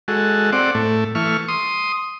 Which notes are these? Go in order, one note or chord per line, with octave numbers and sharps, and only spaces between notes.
G#3 F#4 A4
C4 D5 F#5
A2 A3
E3 A3 C#6 F6
C6 D#6